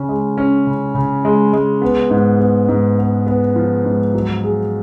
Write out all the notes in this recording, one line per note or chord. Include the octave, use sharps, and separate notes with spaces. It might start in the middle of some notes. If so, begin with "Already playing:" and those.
Already playing: C#3 C#4
G#3
C#4
C#3
C#3
G#3
G#3
B3
G#2
B3
G#2
B3
B3
F3
G#2
F#3
G#4